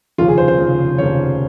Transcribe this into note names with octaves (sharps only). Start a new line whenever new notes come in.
F1 D#2 C#3 F3 F4
G#4
C5
C5
F1 D#2 C#3 F3
F1 D#2 C#3 F3 C#5